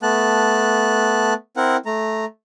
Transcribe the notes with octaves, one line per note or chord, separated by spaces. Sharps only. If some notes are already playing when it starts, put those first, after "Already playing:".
A3 B3 A5 F#6
C4 E4 A#4 F#5
A3 A#5